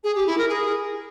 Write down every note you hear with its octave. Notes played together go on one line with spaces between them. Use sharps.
G#4
G4
E4
A#4
G#4